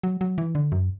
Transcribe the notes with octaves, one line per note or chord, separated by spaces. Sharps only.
F#3
F#3
E3
D3
F#2